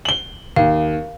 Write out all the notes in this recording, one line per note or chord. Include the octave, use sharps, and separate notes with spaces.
F#7 G7
D#2 F5